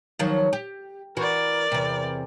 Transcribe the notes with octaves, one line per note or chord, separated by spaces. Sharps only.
D#3 F3 F#3
G4
E3 F#4 A#4 D5
E2 C3